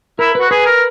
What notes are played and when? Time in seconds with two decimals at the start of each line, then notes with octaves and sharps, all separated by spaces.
0.19 E4 A#4
0.35 B4
0.40 F#4
0.51 G#4 B4
0.66 A#4